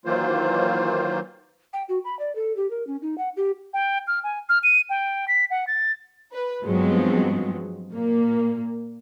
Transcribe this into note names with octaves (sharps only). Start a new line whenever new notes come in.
D#3 E3 F#3 A#3 F4 C5
G5
F#4
B5
D5
A4
G4
A#4
C#4
D#4
F#5
G4
G5
F6
G#5
F6
D#7
G5
B6
F#5
A6
B4
G2 F3 F#3 G#3 B3 C4
A#2 A#3